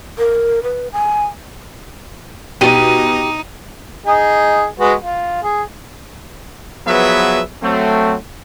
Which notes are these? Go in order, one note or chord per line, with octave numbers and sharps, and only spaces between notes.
A#4
B4
G#5
B2 D#4 G4 D#7
D#4 G#4
G#3 F#4 B4
F4
G#4
F3 F#3 B3 G#4 B4 E5
F#3 A3 C4